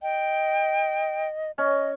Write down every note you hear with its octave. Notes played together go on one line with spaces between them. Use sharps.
D#5 G5
C#4 D#5